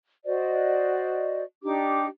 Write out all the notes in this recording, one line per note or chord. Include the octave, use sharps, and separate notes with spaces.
F#4 C5 D5 D#5
D4 D#4 G4 D6